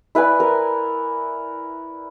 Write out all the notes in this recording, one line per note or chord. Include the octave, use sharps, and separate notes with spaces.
E4 B4 D5 G#5
A#4